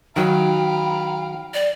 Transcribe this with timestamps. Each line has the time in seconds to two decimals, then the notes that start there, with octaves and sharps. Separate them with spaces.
0.16 D#3 F#3 F5 G5 A#5 B5
1.54 D5